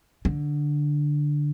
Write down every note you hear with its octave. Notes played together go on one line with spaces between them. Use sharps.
D3